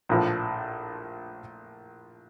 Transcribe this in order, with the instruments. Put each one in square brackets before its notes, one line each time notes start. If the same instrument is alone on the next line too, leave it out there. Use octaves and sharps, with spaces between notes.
[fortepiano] A#1 A2 F3